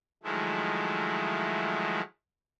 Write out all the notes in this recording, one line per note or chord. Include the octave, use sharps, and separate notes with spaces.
D#3 F3 F#3 G#3 A3 E4